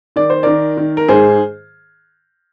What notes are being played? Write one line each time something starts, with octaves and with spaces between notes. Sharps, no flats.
D#3 D5
C5
D#3 A#4 D5
D#3
A#4
G#2 G#4 C5